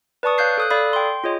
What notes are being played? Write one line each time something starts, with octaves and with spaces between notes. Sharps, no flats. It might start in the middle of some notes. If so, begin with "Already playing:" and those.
B4 D5 A5 C#6 D#6
C#5 F5 F#6 G6 C7
A4 D#6 F#6
A4 D5 F5 B5 D#6
G5 C6
F4 G#4 C#5 D#5